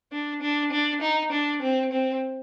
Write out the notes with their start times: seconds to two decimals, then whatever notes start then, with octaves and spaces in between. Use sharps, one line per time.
0.12 D4
0.42 D4
0.72 D4
1.01 D#4
1.32 D4
1.62 C4
1.92 C4